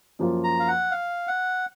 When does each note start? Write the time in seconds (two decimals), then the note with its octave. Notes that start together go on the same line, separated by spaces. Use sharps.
0.19 F#2 F3 A#3 F4
0.44 A#5
0.60 F5
0.68 F#5
0.91 F5
1.28 F#5